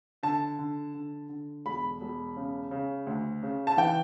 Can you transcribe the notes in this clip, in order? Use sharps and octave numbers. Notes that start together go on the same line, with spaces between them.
D3 A5
D3
D3
D3
E1 B5
E1
C#3
C#3
D2
C#3
A5
E3 G5